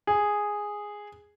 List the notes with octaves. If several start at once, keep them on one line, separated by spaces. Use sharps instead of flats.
G#4